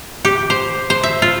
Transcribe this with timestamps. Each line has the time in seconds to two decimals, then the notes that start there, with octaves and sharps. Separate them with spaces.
0.25 G4
0.50 C5
0.90 C5
1.03 E5
1.22 F4